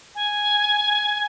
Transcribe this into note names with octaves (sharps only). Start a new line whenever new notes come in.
G#5